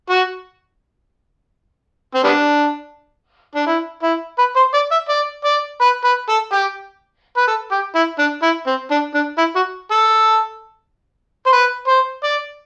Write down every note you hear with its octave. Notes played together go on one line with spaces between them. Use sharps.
F#4
C4
G3 B3 D4
D4
E4
E4
B4
C5
D5
E5
D5
D5
B4
B4
A4
G4
B4
A4
G4
E4
D4
E4
C4
D4
D4
E4
F#4
A4
C5
B4
C5
D5